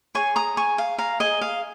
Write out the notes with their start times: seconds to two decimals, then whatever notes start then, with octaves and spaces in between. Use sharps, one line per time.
0.15 G#4 C#5 G#5 C#6
0.36 A#5 D#6
0.57 G#5 C#6
0.78 F5
0.98 F5 A#5
1.20 D#5 G#5
1.41 F5